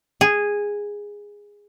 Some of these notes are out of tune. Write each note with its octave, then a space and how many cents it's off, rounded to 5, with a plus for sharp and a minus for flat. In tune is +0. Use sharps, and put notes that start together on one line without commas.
G#4 -10